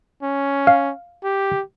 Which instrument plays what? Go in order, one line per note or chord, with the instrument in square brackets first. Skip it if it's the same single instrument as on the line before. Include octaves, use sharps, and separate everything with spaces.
[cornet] C#4
[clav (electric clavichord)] F5
[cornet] G4